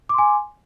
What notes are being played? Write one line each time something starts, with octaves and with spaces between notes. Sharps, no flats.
G#5 C6 D6